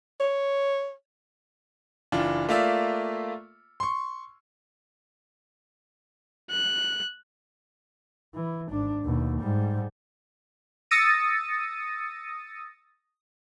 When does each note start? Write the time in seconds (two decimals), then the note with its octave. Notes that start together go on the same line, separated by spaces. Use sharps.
0.20 C#5
2.12 F#1 E3 D4 F4
2.49 A3 A#3 F4 D5 E5 F5
3.80 C6 C#6
6.50 F#6
8.34 E3
8.70 G#1 D4
9.03 D#2 B2
9.40 G#2 G3
10.91 D#6 E6 A6 A#6 C#7 D#7